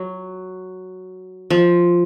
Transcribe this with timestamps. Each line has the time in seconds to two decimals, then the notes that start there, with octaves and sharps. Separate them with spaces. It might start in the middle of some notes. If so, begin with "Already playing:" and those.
Already playing: F#3
1.50 F3